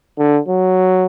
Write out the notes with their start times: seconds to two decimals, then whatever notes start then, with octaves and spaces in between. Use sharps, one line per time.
0.18 D3
0.49 F#3